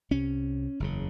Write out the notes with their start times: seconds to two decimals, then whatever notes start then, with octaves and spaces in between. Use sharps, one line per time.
0.11 C2 C3 C#4
0.80 F#1 E2 C#3